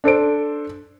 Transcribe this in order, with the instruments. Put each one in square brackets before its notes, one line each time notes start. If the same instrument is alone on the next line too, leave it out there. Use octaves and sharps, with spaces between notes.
[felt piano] D4 A4 C5 D7